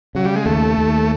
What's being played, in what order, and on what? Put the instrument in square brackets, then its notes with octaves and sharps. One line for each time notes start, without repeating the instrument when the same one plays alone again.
[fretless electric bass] C#3 [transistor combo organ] F#3
[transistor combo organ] G3
G#3
[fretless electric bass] D#2 [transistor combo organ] A3
[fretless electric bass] D#2